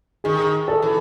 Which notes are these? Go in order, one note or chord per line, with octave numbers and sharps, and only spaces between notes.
D#3 G#4
A4
E3